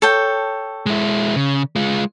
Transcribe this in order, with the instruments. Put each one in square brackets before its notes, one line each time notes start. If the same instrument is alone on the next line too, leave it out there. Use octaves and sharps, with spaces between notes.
[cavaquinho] A4 C#5 G5
[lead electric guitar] G#3 E4
C#3
G#3 F4